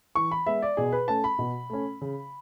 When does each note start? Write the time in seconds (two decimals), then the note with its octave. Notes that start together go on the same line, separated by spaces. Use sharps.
0.15 E3 C#6
0.31 B5
0.46 G#3 B3 E5
0.62 D5
0.77 B2 G#4
0.92 B4
1.08 A3 C#4 A5
1.24 B5
1.39 B2
1.70 A3 C#4
2.01 C#3